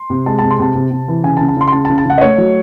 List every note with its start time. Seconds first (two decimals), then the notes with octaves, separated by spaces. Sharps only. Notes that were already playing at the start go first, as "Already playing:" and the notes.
Already playing: C6
0.10 C3
0.26 G#3 A5
0.39 C3 A5
0.51 C6
0.59 C3 A5
0.75 C3
0.91 C3
1.08 E3
1.24 C#3 G#5
1.37 A5
1.41 C#3
1.48 A5
1.57 C#3 C6
1.67 C6
1.72 C#3 A5
1.85 A5
1.90 C#3
1.98 A5
2.06 C#3 F#5
2.18 D#5
2.21 A3 C#5
2.38 F#3